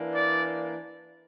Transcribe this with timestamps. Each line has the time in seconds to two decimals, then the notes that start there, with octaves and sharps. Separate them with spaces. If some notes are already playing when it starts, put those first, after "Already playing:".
Already playing: E3 A#3 D4
0.15 D5